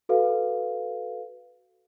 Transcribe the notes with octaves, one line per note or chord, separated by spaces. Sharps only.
F#4 A4 B4 F5